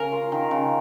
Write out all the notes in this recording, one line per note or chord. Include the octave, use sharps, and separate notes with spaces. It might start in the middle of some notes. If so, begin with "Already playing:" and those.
Already playing: C#3 G#4 A#4
F4
D#3
C#3